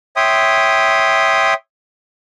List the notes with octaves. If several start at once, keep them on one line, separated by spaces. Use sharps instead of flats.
C#5 E5 G5 C6 D#6